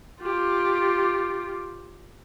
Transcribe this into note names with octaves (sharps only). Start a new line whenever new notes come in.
F4 G4